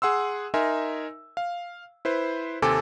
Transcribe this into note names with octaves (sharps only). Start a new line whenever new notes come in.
G#4 F#5 C6 E6
D#4 A#4 E5 G#5 C6
F5
E4 B4 C5
D#2 C3 C4 A4 G#5 D6